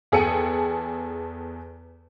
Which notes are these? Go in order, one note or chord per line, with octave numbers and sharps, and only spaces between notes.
E2 G#4 A4 G5 C#7 D#7